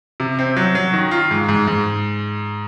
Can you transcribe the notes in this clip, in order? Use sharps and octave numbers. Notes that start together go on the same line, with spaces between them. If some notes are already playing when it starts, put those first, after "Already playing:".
C3
C4
F#3
F#3
D#3
F4
G#2
G#2
G#2